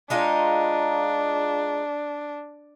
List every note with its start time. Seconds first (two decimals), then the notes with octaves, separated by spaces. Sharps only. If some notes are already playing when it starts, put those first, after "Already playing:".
0.10 G#3 D4 D#4 F4